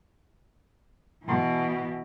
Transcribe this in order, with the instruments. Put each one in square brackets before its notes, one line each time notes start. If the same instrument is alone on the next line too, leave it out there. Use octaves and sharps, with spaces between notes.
[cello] B2 E3